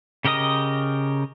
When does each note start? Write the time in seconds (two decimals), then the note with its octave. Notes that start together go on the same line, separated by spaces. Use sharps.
0.25 C#3 G4 A#4 D#5 D#6